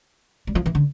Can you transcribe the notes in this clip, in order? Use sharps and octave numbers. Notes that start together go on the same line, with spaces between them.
G3
F3
E3
D3